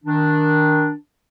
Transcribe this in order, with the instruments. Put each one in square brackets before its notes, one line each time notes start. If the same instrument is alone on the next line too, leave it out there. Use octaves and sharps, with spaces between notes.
[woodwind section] D#3 D4